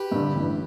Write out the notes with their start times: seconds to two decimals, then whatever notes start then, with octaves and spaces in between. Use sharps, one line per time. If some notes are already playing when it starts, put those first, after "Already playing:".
Already playing: G4 B4
0.11 G2 D3
0.35 A1